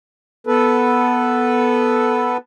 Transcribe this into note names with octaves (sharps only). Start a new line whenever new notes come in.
B3 A4 B4